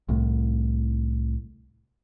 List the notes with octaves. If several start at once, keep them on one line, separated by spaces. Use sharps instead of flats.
C2 A2